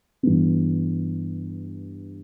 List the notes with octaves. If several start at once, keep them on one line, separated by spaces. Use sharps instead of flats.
G2 E3 B3